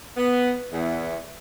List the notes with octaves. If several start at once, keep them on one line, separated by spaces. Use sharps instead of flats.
B3
E2